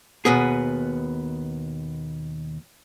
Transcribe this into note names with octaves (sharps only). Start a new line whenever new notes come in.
D#2 B2 B3 G#4